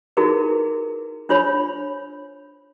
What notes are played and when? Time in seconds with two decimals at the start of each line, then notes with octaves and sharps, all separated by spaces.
0.17 D#4 E4 F#4 G#4 A#4 B4
1.29 D4 F4 C5 C#5 B5